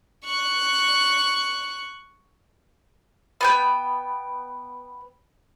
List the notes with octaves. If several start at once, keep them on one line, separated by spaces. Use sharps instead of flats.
C#6 F#6
B3 G5 G6